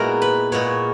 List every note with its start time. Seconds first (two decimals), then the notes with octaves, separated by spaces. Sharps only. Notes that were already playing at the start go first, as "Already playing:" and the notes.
Already playing: A#2 G#3 B3 E4 F#4 A#4
0.22 B4
0.52 A#2 G#3 B3 C#5